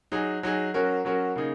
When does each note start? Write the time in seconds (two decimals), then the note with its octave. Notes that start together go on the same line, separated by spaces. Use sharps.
0.12 F#3 D#4 G#4
0.43 F#3 D#4 G#4
0.74 F#3 C#4 F#4 A#4
1.05 F#3 C#4 F#4 A#4
1.36 C#3 A#3 D#4 G#4